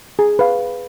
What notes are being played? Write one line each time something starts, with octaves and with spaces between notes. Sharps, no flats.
G#4
B4 F5